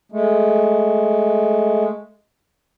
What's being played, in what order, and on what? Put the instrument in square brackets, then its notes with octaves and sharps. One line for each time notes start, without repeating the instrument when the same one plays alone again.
[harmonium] G#3 A3